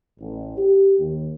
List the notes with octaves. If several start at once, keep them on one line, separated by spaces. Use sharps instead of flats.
A1
G4
D#2